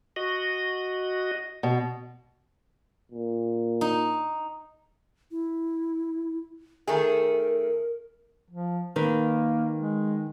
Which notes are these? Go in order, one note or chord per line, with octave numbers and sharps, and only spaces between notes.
F#4 D#5
B2
A#2
D#4
E4
D#3 A3 G#4 A#4
F3
D#3 A#3 B4
G#3